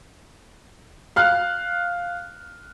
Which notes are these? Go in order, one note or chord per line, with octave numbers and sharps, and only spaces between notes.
F5 F6 F#6